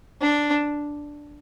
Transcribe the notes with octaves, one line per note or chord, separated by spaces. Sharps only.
D4